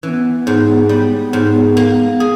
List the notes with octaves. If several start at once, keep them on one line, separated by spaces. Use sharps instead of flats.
E3 C#4
B3
G#2
G3 B3
G#2
A#3
G#4